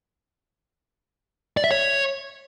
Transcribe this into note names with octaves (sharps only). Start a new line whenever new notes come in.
D5
E5
C#5